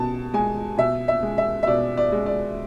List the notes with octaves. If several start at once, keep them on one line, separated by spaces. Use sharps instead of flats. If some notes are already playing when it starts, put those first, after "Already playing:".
Already playing: B2 A5
G#3 G#5
B2 E5
E5
G#3
E5
E5
B2 D5
D5
G#3
D5